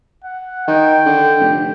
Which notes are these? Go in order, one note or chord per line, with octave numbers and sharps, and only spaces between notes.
F#5
D#3 G5
D3
F1